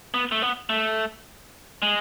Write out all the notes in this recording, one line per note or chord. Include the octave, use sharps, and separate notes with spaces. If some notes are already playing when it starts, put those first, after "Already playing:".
B3
A3
B3
A3
G#3